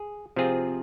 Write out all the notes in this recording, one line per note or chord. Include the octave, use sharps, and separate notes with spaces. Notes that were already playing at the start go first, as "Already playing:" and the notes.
Already playing: G#4
C3 F3 C4 F4 G#4